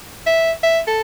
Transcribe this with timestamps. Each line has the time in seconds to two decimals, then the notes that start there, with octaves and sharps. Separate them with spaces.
0.27 E5
0.63 E5
0.87 A4